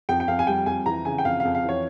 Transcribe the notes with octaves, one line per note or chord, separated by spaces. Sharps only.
F2 G5
G5
F2 F5
G#5
G3 G5
F2 G#5
E3 A#5
C#3 G#5
G5
F2 F5
F5
F2
F5
E3 C#5